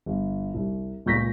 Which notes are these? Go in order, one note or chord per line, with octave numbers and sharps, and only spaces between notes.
G1
C2
C#2 A#2 C#6 G6 A#6 B6